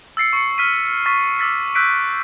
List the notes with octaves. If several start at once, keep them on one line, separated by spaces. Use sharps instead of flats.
E6 A6 C7 C#7
C#6 C#7
F6 B6 D#7
C#6 A6 B6
D6 E6 A6 B6
E6 F#6 G6 B6 D7